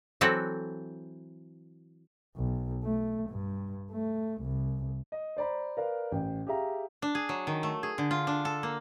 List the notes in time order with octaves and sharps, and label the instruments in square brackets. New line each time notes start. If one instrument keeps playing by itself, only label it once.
[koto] E3 F#3 C4 F#4 A4
[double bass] B1
A3
G2
A3
C2
[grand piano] D#5
C5 D5 A#5 B5
A#4 B4 D5 F5
A1 G5
G4 G#4 E5 F5 A#5
[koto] D4
G#4
F#3
D#3
A3
G#4
D3
F4
D4
A4
A#3